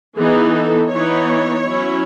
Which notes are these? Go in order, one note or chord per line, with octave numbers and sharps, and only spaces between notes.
E3 B3 D#4 G#4
A4
E3 B3 D#4 C#5
F#3 C#4 E4